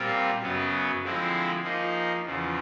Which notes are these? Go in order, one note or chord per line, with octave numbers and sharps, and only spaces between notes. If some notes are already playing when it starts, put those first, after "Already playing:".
Already playing: A#2 G3 C4 F4
F#2 C#3 F#3 B3
D3 F3 G#3 C4 E4
F3 A#3 D#4 G#4
E2 C#3 F3